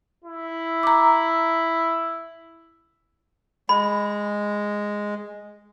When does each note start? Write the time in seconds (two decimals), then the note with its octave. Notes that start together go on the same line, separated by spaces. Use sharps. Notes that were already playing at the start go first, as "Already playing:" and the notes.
0.24 E4
0.83 A#5 D6
3.69 G#3 B5